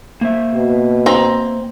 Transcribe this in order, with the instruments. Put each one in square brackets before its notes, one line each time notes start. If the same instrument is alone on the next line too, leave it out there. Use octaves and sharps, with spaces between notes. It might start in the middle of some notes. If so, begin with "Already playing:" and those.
[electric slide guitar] A#3 C5 E5
[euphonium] B2
[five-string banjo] C4 A#5